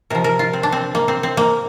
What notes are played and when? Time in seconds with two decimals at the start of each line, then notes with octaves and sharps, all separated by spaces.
0.10 C3 F3 A#4
0.24 A#4
0.39 F4
0.53 C4
0.63 D4
0.72 C4
0.95 A#3
1.08 C4
1.23 C4
1.37 A#3